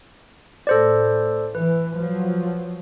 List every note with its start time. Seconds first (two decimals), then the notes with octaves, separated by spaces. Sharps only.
0.67 A2 A4 C5 D5
1.55 E3 B4
1.96 F3 F#3